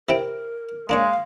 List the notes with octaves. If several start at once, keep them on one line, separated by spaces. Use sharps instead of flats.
C3 E4 A#4 G5
G#3 A#3 D4 C#5 F5